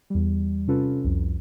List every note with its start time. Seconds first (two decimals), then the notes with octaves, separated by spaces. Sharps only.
0.10 E2 G3
0.68 C3 C#4 F4 A4 B4
1.04 C2 F2